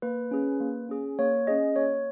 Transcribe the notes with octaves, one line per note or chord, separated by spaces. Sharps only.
A#3 B4
C#4 G#4
A#3
C#4 G#4
A#3 C#5
C#4 G#4 D#5
A#3 C#5